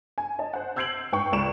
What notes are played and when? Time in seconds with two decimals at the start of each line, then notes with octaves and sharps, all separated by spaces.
0.18 G#5
0.39 D#5 A5
0.53 C5 F#5
0.76 E6 G6 G#6 C7 D7 F#7
1.12 G#2 B4 G5 C#6
1.32 C#2 D5 C#6 D7 E7